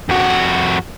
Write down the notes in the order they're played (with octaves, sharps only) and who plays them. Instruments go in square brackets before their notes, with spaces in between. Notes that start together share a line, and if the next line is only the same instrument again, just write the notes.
[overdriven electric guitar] F2 F#4